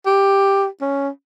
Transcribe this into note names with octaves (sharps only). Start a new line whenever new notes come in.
G4
C#4